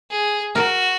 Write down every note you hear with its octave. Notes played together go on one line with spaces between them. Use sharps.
G#4
F#4 A#4